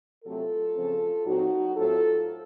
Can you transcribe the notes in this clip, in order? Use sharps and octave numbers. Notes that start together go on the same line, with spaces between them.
C3 F#3 A3 C4 F4 A4
C#3 F3 C4
A#2 F#3 C4 D#4 F#4
A2 F#3 C4 F4 A4